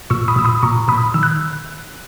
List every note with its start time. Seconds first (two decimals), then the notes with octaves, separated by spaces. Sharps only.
0.10 A#2 C#6 E6
0.28 B5 D#6
0.36 A#2 E6
0.45 B5 D#6
0.63 A#2 A#5 C#6
0.88 A#2 B5 D#6
1.14 D#3 E6
1.23 F#6